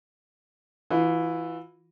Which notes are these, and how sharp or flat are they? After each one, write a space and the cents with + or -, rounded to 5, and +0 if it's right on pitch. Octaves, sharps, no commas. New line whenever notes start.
E3 +0 F4 +35